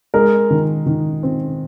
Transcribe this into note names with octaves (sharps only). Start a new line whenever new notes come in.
G#3 A#4
D#3
D#3
C4